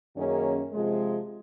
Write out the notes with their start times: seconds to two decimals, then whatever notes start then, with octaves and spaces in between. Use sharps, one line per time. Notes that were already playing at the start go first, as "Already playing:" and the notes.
0.15 F#2 D#3 A#3 C#4 G#4
0.73 C3 F3 G#3